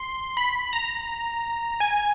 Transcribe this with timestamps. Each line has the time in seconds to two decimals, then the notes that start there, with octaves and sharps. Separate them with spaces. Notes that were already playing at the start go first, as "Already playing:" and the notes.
Already playing: C6
0.37 B5
0.73 A#5
1.80 G#5